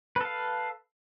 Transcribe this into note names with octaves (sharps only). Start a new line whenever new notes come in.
A4 B4 F5